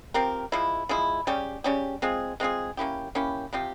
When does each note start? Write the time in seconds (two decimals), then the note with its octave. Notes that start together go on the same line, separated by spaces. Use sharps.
0.14 F3 C4 G4 A#4
0.52 F3 G#3 E4
0.89 F3 G#3 E4
1.27 C#3 G3 C#4 G4
1.64 C#3 G3 C#4 G4
2.02 G#3 C4 F4 G#4
2.40 G#3 C4 F4 G#4
2.77 A#3 C#4 E4 G4
3.15 A#3 C#4 E4 G4
3.53 C3 F3 C4 G4